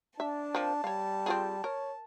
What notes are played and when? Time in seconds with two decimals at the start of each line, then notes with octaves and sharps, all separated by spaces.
0.20 D4 E5 A5
0.55 F3 C4 A#4
0.84 G3 C#5 F5
1.26 C4 F4 G#4
1.64 A#4 C#5